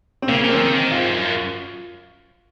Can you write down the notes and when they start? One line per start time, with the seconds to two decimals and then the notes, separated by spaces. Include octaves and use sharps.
0.22 C4
0.28 C#3 A#3
0.44 C#3
0.49 F3 C4
0.60 D#3
0.75 D#3
0.88 A#2
0.91 G#2 F4
1.12 F#2